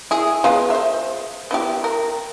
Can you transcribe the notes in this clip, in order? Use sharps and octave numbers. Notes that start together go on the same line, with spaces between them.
E4 G#4
G#3 B3 F4
C5 E5
B3 E4 G4
A#4